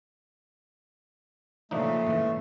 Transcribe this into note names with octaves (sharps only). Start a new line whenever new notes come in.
A#2 C#3 F3 A3 D4 D#4
G#2 E3